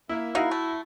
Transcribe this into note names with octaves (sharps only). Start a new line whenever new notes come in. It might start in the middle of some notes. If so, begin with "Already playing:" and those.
A#3 E4 E5
A#3 D#4 E4 F#4 F5
A3